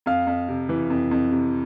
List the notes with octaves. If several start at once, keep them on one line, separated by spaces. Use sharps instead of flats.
F2 F5
F2
C3
E3
F2
F2
C3